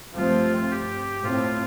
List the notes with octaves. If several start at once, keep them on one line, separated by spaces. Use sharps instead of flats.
G2 F3 A3 C4 F4
G4
A2 A3 C4 F4